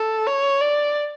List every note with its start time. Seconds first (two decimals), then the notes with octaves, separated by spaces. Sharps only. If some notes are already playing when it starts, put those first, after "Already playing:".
Already playing: A4
0.27 C#5
0.61 D5